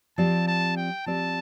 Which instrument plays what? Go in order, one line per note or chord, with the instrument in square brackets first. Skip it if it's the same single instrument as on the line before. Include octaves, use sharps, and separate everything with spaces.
[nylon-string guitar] F3 C4 G4 D5 [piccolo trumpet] A5
[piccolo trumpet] A5
G5
[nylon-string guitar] F3 C4 G4 D5 [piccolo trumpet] A5